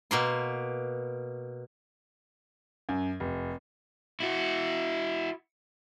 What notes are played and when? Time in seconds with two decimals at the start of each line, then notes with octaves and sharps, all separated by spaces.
0.11 B2 A#3 C6
2.89 F#2
3.20 F1
4.20 E4 F#4